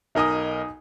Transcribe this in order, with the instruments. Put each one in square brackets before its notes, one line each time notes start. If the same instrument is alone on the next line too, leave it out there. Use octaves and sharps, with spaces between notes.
[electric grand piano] B1 A#4 D#5 [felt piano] D#4 G#5 D#6